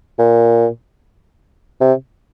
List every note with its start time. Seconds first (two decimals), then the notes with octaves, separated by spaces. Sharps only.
0.18 A#2
1.81 C3